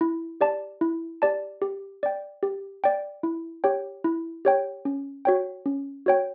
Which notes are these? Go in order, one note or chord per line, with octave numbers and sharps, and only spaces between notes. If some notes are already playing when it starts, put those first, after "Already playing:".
E4
G4 D5 A5
E4
G4 D5 A5
G4
D5 G5
G4
D5 G5
E4
G4 C#5 G5
E4
G4 C#5 G5
C#4
F#4 C#5 G5
C#4
F#4 C#5 G5